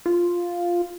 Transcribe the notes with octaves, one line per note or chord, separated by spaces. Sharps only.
F4